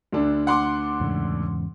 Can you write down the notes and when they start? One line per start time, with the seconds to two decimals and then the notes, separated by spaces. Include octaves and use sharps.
0.12 D2 D3 D4
0.47 F#5 C6 D6
1.00 E2 G#2 C#3